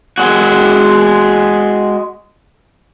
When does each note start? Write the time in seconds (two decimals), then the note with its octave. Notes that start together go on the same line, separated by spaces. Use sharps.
0.18 G#3 F#4